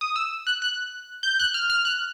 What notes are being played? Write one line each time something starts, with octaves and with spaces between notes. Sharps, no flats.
D#6
E6
F#6
F#6
G6
F#6
F6
F6
F#6